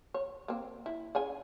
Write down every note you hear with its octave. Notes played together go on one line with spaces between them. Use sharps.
C#5
A#3 C4
E4
C#4 G#4 G#5